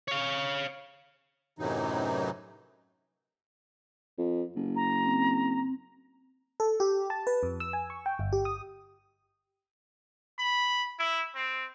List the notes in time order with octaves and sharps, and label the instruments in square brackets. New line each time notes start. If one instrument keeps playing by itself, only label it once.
[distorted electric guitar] C#5 F5
[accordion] F#2 A2 C3 E3 F#3 D#4
[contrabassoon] F2
F#1
[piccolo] A#5
[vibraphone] C4
[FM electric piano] A4
G4
A5
B4
F2
E6
G#5
C#6
G5
G1
G4
D#6
[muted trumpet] B5
E4
C4